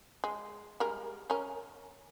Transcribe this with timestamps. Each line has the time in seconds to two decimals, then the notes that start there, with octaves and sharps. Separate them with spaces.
0.24 G#3
0.80 G3 G#3 A#4
1.30 C#4 A#4